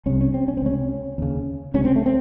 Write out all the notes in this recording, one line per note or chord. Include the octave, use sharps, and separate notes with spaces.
C2 C3 C#4
C#4
C4
C#4
C4
C#2 C3 C#4
D#2 C#3
C#2 C3 C#4
C4
A3
C4